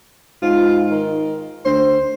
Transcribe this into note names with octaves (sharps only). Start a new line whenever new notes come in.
G#2 F4
D#3
D2 C5